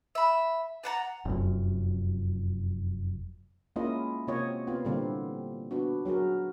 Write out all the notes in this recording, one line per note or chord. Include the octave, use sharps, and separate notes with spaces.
E5 B5
D5 F#5 A5 A#5
F1 F#2
G#3 A#3 C#4 E4 F4 D#5
C3 A#3 C4 F4 C#5 D#5
B3 C4 F4
A#2 D3 E3 G3 A#3 C4
B3 D4 F#4
F#3 F#4 G#4 A#4